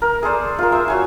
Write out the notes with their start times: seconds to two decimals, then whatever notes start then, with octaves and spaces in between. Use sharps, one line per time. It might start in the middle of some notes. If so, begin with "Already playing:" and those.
0.02 A#4
0.23 G#4 A4 C5 D5
0.58 F4 A#4
0.72 C5 E5
0.88 F#4 C#5 G#5